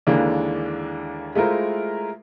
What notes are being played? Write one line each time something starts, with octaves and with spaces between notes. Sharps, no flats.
D#2 D3 E3 G#3 A#3 D4
G#3 A3 E4 F4 A#4 C5